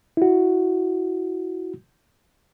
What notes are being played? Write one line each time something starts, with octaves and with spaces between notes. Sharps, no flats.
E4 F#4